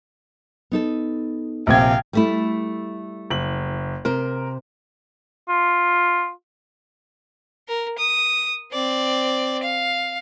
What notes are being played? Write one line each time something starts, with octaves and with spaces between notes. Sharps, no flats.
B3 D#4 A4
A#1 C3 F5 G5 G#6
G3 A3 E4
F#1 F#7
C3 A#4 C5
F4
A#4
D#6
C4 D5
F5